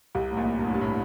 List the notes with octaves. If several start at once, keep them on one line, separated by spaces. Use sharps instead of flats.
C2 C3
A2
A#1 A#2
G2
A2
G2
A2